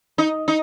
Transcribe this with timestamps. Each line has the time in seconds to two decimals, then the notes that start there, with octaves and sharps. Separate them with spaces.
0.18 D#4
0.48 D#4